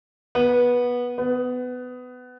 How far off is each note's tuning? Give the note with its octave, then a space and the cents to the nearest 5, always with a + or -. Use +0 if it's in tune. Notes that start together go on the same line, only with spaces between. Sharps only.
B3 -15
B3 +20